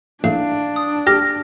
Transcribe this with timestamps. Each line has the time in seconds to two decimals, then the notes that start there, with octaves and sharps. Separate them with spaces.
0.24 A1 D4 F5
0.76 D#6
1.07 G4 F6 A#6